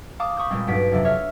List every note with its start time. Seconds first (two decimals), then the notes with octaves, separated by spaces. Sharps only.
0.20 F5 A5 D6 D#6
0.37 B5 C#6 D#6 G6
0.50 A#2 G3 G#3 C4
0.67 B1 G2 F#4 B4 B6 D7
0.92 F2 C3 F#3 D4
1.05 C#5 E5 F6